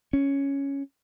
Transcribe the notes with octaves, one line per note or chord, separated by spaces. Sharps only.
C#4